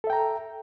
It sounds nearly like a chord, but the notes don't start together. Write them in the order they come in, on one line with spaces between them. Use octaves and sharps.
A4 E5 G5 A#5